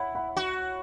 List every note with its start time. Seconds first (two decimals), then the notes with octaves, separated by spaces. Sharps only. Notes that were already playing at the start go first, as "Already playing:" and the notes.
Already playing: E4 C#5 F#5 B5
0.15 F#5 B5
0.36 F#4